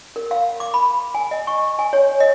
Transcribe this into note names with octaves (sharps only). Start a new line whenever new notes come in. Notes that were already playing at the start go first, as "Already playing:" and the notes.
A#4
F5
D6
B5
G#5
D#5
C#6
G#5
C#5
D#5